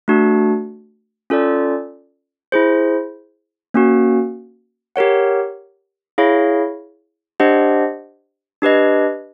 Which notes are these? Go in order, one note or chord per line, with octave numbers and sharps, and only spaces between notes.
A3 D4 F#4
C#4 F4 A4 D5
E4 G#4 C5
A#3 C#4 F#4
G4 A#4 C#5 F#5
E4 G#4 C#5 F5
D4 G4 C5 D#5 F#5
D4 G4 B4 D#5